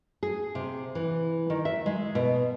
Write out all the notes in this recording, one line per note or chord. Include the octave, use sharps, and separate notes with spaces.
G#4
C3
E3
D#3
E5
G#3
B2